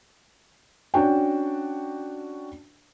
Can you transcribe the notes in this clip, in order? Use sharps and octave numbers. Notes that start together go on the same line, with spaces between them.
C#4 D4 F#4 G5